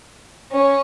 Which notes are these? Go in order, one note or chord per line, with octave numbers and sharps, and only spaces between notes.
C#4